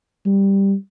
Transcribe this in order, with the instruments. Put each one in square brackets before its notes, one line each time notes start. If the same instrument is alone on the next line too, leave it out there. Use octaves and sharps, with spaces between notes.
[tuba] G3